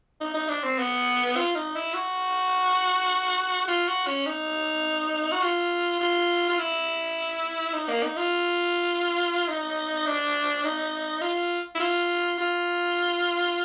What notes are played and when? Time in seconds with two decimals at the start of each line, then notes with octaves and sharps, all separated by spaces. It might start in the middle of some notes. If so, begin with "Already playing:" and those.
0.20 D#4
0.34 D#4
0.49 D4
0.64 C4
0.79 B3
1.37 F4
1.56 D#4
1.75 E4
1.94 F#4
3.68 F4
3.88 F#4
4.07 C#4
4.26 D#4
5.32 F#4
5.42 F4
6.00 F4
6.49 F4
6.59 E4
7.74 D#4
7.89 A#3
8.03 D#4
8.17 F4
9.48 D#4
10.06 D4
10.65 D#4
11.22 F4
11.75 E4
11.80 F4
12.38 F4